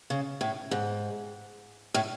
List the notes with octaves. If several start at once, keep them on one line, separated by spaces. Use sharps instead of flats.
C#3
A2
G#2
A2